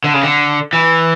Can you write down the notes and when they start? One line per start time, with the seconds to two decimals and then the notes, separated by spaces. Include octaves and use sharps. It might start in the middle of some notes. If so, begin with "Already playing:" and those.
0.04 D3
0.14 C#3
0.23 D3
0.73 E3